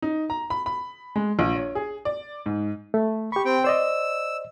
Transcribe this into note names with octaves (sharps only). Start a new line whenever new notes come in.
D#4
A#5
B5
B5
G#3
A#1
C#5
G#4
D5
G#2
A3
G4 B5 C#6
C4 G5
C5 D5 D#5 E6